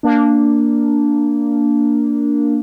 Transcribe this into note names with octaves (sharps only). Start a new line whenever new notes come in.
A#3 D4